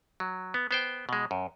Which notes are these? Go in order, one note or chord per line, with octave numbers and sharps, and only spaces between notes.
F#3
B3
B3 C5 G5
B2 G#3
F#2